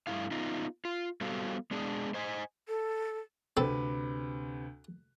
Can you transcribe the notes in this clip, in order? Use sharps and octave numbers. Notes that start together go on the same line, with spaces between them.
G2 F3 A3 E4 F5
B3 D#4 F4
F4
G3 B3 F#4 A4 C5 F5
G#3 B3 D4 G#4
C5 D#5 G#5
A4
D2 C3 C4 A4 B4